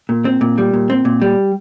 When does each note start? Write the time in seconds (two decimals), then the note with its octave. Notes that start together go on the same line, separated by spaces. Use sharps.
0.09 A#2
0.25 C4
0.41 A#2
0.58 G3
0.73 A#2
0.90 C4
1.05 A#2
1.22 G3